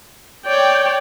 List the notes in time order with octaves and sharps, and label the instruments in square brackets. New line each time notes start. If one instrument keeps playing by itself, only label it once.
[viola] C#5 D5 [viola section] G5